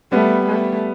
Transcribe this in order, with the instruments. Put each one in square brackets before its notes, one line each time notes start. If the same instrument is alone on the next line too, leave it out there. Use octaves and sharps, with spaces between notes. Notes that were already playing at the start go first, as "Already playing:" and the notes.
[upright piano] G3 B3 [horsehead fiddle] A3
[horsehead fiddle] A3